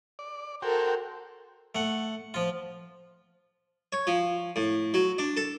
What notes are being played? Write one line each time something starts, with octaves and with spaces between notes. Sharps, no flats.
D5
F#4 A4 A#4 C5 G5
A3 F#5
F3 F4
C#5
F3
A2
F#3
D4
A4